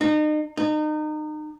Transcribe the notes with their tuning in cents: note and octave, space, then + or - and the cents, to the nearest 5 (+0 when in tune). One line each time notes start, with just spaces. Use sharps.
D#4 -35
D#4 -30